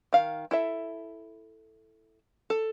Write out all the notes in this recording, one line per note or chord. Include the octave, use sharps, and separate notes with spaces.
D#3 F5
E4 A4 E5
A4